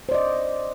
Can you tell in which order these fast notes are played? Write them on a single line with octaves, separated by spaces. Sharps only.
C5 D5 D#5